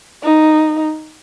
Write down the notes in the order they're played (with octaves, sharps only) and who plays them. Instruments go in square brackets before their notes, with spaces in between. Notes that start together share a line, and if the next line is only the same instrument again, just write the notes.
[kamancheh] D#4